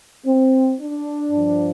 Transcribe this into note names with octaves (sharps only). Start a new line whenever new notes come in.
C4
D4
G2 F3